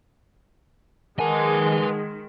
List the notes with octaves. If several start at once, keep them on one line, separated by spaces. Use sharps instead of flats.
D#3 G#3 A#4 B4 F#5 G#5 A5